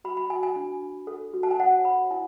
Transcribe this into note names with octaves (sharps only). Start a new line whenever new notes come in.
F#4 B5
B5
F#4 G#5
G#5
D4
D4
A4
F#4
A5
G#5
C#5 F#5
C#5 B5
E4 G#5